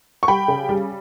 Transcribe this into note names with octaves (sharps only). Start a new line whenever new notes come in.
C#6
G3 G5 B5
C#3
G3